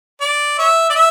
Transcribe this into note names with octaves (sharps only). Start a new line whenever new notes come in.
D5
C#5 E5
D5
E5